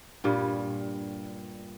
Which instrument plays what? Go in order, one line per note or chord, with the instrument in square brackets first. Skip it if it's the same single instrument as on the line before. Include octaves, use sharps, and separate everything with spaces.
[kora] G2 A#2 G3